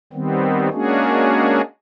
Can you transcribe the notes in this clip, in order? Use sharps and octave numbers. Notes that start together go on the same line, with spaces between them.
D#3 G3 B3 C4
G#3 A#3 C#4 D4 F#4 G#4